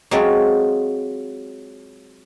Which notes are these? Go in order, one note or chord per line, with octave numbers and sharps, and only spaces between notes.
F#3 G#3 C4 F4 A4 C#5